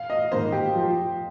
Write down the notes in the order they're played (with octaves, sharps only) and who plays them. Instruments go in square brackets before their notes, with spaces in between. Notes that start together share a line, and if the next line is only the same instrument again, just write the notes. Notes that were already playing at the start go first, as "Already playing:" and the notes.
Already playing: [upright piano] F5
D#5
[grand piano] G#2 D#3 A#3 [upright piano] C5
[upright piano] G4
[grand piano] F3